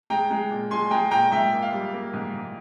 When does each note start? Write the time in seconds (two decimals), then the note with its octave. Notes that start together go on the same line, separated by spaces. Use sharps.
0.10 G#3 G5 A#5
0.30 G#3
0.51 A#2
0.71 G#3 G#5 C6
0.91 G#3 G5 A#5
1.11 A#2 G5 A#5
1.32 G#2 E5 G5
1.53 A#3
1.62 F5
1.72 G3
1.94 A#3
2.13 G#2
2.34 G#2